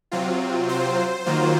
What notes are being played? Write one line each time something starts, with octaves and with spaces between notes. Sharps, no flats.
C3 F#3 C4 F4
C5
D#3 F#3 A#3 F4